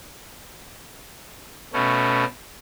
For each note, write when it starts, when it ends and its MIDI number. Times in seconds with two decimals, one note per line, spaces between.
1.73 2.25 47
1.73 2.25 57
1.73 2.25 61